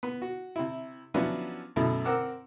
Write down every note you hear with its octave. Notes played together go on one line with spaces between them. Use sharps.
B3
F#4
C3 E4
F3 F#3 B3 C#4 D4 E4
F#2 B2 A3 E4
C4 A#4 F#5 D6 E6